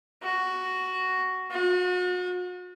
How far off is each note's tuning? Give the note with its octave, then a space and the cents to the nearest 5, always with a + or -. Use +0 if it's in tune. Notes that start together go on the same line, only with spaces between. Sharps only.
F#4 +5
F#4 -40